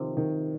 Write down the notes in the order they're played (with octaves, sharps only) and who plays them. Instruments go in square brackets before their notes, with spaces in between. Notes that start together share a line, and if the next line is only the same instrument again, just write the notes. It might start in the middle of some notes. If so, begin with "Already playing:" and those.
Already playing: [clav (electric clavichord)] C3 F3 C4 [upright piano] D#3
[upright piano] D#3